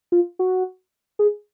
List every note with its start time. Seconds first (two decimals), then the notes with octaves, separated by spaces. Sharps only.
0.12 F4
0.39 F#4
1.19 G#4